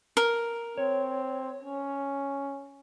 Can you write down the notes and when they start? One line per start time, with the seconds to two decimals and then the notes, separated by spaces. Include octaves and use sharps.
0.17 A#4
0.78 C4 C#5
1.63 C#4